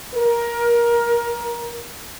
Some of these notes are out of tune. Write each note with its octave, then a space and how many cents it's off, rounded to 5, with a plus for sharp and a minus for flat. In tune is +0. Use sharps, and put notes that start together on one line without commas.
A#4 +20